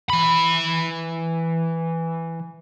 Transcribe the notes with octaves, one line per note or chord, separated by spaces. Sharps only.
E3 B5